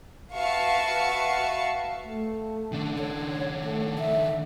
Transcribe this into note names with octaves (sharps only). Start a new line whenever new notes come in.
F#4 B4 E5 F5 A5 C#6
A3
D#3 D4
C#5
A3
E5